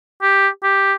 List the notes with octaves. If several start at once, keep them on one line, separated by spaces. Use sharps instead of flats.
G4
G4